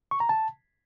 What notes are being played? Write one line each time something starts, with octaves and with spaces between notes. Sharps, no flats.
C#6
A#5
A5